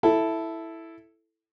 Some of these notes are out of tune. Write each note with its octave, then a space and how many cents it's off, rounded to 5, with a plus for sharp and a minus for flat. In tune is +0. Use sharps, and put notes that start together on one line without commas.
E4 +0 A4 +0